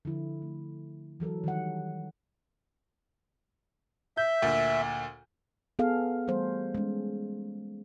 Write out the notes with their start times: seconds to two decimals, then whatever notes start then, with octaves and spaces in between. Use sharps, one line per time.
0.05 D3 F3 E4
0.42 A3
1.20 E3 F#3 A4 A#4
1.44 D#3 F3 G3 F#5
4.17 E5 G6
4.42 D2 A#2
5.79 B3 G#4 A4 F5
6.27 E3 G3 A3 C5
6.75 G#3 C#4